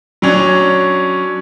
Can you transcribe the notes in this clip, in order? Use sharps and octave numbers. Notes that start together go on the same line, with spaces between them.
F#3 C#4 D4